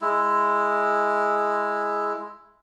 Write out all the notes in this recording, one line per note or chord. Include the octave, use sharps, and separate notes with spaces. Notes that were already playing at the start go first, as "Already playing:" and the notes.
G#3 E4